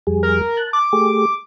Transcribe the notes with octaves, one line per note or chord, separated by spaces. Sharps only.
F2 G3 G#4
A#4
A5 F#6
D6
A3 G4 G#4